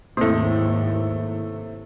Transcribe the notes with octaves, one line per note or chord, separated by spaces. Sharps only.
D#2 G#2 C3 A3 A#3 E4